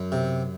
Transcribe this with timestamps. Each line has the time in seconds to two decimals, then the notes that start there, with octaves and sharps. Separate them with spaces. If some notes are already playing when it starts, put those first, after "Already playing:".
Already playing: F#2
0.12 C3